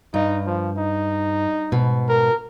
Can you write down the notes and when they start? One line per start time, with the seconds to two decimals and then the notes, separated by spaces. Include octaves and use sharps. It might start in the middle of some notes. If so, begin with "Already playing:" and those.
0.14 G2 D#4
0.46 F3
0.77 D#4
1.72 G#2 B2
2.08 A#4